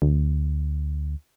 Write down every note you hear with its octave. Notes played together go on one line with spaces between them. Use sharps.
D2